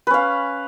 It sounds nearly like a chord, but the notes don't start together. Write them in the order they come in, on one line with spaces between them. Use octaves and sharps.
B4 C#4 F5